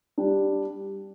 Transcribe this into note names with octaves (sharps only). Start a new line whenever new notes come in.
G3 D4